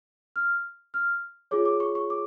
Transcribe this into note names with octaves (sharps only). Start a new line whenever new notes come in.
F6
F6
F4 G#4 C#5 D6
D6
C#6
C#6
D6